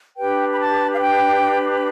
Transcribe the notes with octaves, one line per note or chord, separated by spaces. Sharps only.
D4 G4 B4 G5
B5
A5
F5
G5